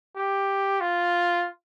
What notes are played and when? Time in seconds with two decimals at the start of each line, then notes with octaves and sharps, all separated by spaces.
0.17 G4
0.81 F4